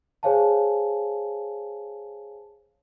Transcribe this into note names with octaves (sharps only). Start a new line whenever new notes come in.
G#4 C5 C#5 F5 G#5 A5